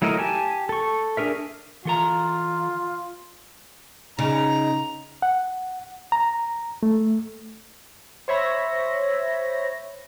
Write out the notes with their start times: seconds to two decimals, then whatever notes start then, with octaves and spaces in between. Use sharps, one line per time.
0.02 F#3 A3 E4 A#4 D#5
0.19 G4 G#5 A5
0.69 A4 C#6
1.17 D4 G#4 A#4 E5
1.85 E3 F4 A4 A#5
4.19 C#3 D#4 A#5
5.22 F#5
6.12 A#5
6.83 A3
8.28 C5 C#5 E5 B5 A#6